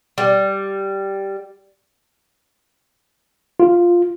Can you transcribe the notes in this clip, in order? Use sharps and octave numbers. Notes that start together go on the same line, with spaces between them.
G3
F4